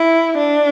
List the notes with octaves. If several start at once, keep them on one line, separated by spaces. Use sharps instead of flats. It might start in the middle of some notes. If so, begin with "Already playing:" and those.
Already playing: E4
D4